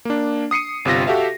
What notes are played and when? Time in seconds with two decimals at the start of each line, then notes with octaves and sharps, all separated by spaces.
0.05 A#3 D4
0.51 D#6 C7 C#7 D#7
0.85 G1 C3 F4 A#6
1.07 F#4 G4 A4 E5 F5